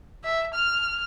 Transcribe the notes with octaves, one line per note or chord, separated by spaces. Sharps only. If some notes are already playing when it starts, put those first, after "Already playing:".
E5
F6